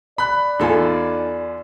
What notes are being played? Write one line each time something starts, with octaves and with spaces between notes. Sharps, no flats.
D5 B5 F#6
E2 D#4 F4 A4 G#5